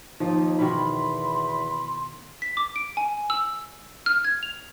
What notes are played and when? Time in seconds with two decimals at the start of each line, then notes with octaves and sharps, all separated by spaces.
0.20 D#2 F3 D#4
0.59 E2 B2 D#3 B5 C6
2.42 B6
2.57 D6
2.76 D7
2.97 G#5
3.30 E6
4.06 F6
4.25 G#6
4.43 F7